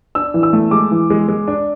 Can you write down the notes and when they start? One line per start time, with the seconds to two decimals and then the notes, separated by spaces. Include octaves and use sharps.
0.15 D4 E6
0.34 E3
0.43 E6
0.53 A3
0.71 G#3 D6
0.91 E3
1.10 G#3
1.29 G#3
1.48 D4